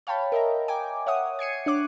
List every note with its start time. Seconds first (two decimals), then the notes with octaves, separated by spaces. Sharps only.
0.07 C#5 F5 G5 A5 B5
0.32 A#4 D#5 E5 A#5
0.68 G5 G#5 D6
1.07 C#5 E5 F#5 D#6
1.39 G#6 C7 C#7 D#7
1.66 D4 C#5 D6 F#6